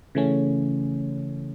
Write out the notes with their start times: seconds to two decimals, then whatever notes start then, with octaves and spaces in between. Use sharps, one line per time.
0.15 C#3 E3 A3 C#4